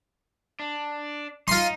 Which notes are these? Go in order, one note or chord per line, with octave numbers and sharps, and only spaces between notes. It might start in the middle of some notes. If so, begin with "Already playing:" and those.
D4
D#4 F4 C6